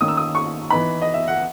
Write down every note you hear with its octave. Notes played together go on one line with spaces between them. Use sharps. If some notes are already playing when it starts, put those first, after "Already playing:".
D#3 A#3 C#4 D#6
E6
D#6
C#6
E3 B3 D#4 B5
D#5
E5
F#5